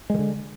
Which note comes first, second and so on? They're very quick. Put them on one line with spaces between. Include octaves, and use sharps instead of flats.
G#3 D#3 D3